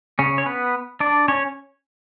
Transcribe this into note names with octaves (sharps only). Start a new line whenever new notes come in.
C#3 C#4
C#5
B3 B4
D4 D5
C#4 C#5